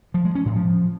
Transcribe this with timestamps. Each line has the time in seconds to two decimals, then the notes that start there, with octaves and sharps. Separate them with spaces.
0.14 F3
0.25 G#3
0.35 C#4
0.46 A2
0.56 F3